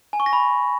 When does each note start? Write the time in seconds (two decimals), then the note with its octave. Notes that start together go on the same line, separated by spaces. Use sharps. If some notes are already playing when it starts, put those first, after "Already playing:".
0.13 G#5
0.20 C#6
0.26 A#6
0.33 B5